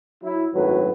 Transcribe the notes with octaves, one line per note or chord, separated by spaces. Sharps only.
F#3 E4
G#1 F#2 A2 F#3 B4